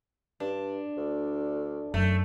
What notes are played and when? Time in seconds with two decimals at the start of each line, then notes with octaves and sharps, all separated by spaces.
0.40 G2 D4
0.97 D2
1.94 F#2 A3